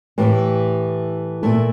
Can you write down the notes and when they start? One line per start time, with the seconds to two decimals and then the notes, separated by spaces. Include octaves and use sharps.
0.18 A2 E3 A3 E4 G4
1.43 A#2 A3 E4